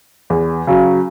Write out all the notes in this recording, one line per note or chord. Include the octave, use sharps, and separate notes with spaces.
E2
C#3 F#3